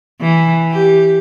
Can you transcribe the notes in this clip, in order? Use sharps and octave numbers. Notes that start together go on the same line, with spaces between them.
E3
G4